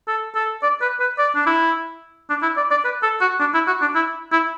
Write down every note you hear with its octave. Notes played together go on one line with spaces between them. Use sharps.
A4
A4
D5
B4
B4
D5
D4
E4
D4
E4
D5
D5
B4
A4
F#4
D4
E4
F#4
D4
E4
E4